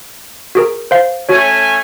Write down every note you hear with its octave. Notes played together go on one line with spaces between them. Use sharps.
F#4 G#4 A#4
C5 F5
A3 C#4 F#4 C#5 G#5